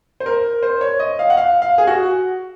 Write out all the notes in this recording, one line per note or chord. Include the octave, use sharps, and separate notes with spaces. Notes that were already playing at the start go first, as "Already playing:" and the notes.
C5
A#4
C5
C#5
D#5
F5
F#5
F5
F5
G#4
F#4